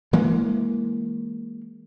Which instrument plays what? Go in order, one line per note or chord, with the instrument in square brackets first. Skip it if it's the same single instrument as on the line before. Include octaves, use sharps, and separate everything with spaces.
[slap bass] E3 G#3 A#3